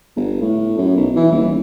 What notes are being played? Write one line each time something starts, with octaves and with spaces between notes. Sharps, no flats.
G1
A2
F#2
B1
E3
D#1